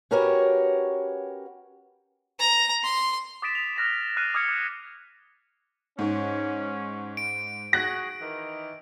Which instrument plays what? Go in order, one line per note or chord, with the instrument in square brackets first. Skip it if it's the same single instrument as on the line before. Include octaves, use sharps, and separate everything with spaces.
[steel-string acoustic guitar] C#4 F#4 G4 A#4 B4 C#5
[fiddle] A#5
C6
[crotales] D6 D#6 A6 B6 D7 E7
F7
F6 F#6 A#6 B6 E7
F6 F#6 C7 D#7 E7
D6 D#6 F6 G#6 A6 C#7
D6
[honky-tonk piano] G#2 [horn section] C#4
[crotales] D7
[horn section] F#4 G#4 [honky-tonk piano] F#6 A#6
[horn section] D#3 E3